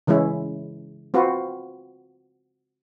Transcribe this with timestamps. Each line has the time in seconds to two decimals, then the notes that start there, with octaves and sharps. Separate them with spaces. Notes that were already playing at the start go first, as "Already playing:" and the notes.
0.07 C#3 E3 G#3 C#4 E4
1.14 C4 F4 F#4 B4